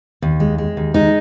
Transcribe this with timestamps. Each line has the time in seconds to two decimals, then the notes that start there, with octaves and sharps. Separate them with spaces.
0.22 D#2
0.40 G#3
0.58 G#3
0.77 D#2
0.94 G#3 D#4